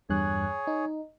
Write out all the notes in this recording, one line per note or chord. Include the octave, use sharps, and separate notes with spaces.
E2 G2 G#4 C#5 F#6
D#4